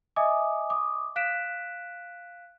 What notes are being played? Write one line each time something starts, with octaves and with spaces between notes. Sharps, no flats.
D#5 E5 G#5 D6 D#6
D6 D#6
F5 F#6 B6 D7 E7